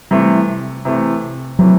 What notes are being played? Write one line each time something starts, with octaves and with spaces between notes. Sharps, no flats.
C3 E3 G3 A3
C3 E3 A3
C3 E3 F#3 A3